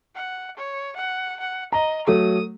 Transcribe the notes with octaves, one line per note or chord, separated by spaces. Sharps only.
F#5
C#5
F#5
F#5
D#5 A#5
F#3 A3 D#6